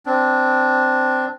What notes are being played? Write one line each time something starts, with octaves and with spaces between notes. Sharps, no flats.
C4 D4